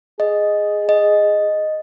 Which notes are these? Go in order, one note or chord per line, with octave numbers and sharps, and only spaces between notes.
G#4 D#5
D#5